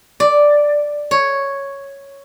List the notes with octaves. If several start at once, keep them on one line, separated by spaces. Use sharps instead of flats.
D5
C#5